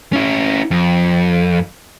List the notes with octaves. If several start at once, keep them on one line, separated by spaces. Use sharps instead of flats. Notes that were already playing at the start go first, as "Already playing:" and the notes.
C#4 E4
F2